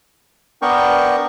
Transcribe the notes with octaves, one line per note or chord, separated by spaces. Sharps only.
B3 D4 A#4 G5 C#6